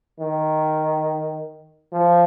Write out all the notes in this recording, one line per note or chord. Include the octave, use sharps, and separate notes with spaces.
D#3
F3